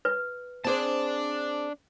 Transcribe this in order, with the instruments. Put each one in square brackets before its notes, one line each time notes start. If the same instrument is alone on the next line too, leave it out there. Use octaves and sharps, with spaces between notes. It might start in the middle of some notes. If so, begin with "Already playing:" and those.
[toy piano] B4
[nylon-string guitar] C4 G#4 C5 [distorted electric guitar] D4 A5